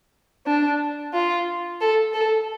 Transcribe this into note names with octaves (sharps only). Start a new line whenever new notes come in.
D4
F4
A4
A4